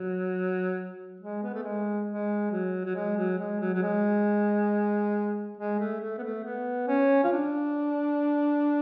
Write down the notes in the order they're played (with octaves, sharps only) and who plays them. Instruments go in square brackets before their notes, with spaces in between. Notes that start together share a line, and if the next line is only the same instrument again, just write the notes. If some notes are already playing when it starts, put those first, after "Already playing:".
Already playing: [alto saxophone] F#3
G#3
B3
A3
G#3
G#3
F#3
F#3
G#3
F#3
G#3
F#3
F#3
G#3
G#3
A3
A3
B3
A3
B3
C#4
F4
D4